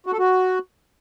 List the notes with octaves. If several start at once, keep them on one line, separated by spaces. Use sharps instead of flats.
F#4
A4
F#4